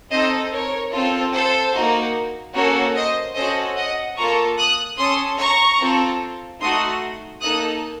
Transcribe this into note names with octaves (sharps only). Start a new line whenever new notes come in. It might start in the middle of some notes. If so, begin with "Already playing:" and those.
C4 D#4 A4 C5 D#5
A#4 C#5
C4 F4 A4
A4 C5
A#3 D#4 F#4
A#3 C#4 F#4 A4 A#4 C#5
C5 D#5
C#4 F#4 A4 C5 D#5
D#5 F#5
A#3 F4 A4 A#5 C#6
D#6 F#6
C#4 A4 C6 D#6
A#5 C#6
C4 F4 A4
A3 D#4 F#4 C6 D#6
A#3 D#4 A4 D#6 F#6